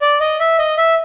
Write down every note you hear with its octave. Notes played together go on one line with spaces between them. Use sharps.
D5
D#5
E5
D#5
E5